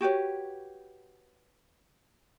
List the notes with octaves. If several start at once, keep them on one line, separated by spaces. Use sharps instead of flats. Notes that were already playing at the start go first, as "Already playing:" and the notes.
F#4 G4 B4 C#5